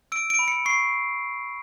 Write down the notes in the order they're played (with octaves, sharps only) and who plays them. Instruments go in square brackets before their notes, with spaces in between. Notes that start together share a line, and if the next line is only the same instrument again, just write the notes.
[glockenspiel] E6 D7
D7
B5
C#7
C#6 C7